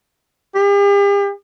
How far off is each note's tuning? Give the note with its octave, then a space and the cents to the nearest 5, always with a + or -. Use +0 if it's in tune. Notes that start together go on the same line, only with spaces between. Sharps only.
G4 +45